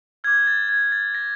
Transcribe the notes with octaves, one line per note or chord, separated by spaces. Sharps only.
D6 F6 G#6
A6
G#6
A6
A#6